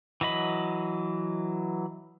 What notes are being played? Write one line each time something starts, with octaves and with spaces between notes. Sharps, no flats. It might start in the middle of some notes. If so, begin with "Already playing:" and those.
E3 F#3 D#5 B5